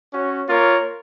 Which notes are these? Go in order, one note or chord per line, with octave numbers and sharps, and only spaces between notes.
C#4 F#4 C#5
A#3 F4 A#4 C#5